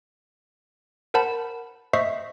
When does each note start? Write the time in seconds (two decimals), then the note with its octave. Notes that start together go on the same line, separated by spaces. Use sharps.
1.14 A#4 C5 F#5 A5 B5
1.93 C5 D#5 E5 C#6 B6 C7